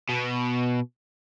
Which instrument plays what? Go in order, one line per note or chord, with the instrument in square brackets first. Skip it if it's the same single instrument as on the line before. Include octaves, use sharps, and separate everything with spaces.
[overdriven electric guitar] B2